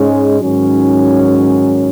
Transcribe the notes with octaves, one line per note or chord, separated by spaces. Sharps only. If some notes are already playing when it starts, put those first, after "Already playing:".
Already playing: G#2 G#3 C#4
G#2 D#3 F#3 C#4